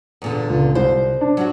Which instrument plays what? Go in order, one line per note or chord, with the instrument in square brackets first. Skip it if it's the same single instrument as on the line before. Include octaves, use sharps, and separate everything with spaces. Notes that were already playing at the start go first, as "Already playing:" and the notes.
[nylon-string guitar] E2 A#2 D3
[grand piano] C#2
[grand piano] C2 [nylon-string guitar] C5
[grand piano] D4
[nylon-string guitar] F#3 F4 F#4